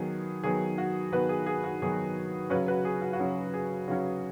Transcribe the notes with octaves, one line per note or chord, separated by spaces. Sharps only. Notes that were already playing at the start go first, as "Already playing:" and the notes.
Already playing: D#3 F#3 B3 G#4
D#3 F#3 B3 G#4
F#4
D#3 F#3 B3 F#4 B4
G#4
G#4
F#4
D#3 F#3 B3 G#4
C#3 F#3 C#4 F#4 B4
F#4 B4
G#4
F#4
F#4
C#3 F#3 C#4 G#4
G#4
C#3 F#3 C#4 F#4